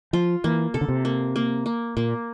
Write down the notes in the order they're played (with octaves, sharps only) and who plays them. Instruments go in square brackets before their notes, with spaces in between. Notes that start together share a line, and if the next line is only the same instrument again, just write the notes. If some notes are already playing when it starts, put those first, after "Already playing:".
[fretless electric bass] F3 [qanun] F4
[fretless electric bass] E3 [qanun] A#3
[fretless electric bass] C3 [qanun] A4
[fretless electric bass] D3
C3
[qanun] A#3
A#3
A#3
[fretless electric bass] A#2 [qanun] A#3